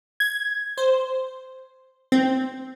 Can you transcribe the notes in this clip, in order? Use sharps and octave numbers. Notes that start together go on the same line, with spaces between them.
G#6
C5
C4